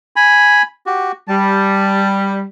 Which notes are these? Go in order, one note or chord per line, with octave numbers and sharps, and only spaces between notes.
G#5 B5
F#4 G4
G3 A5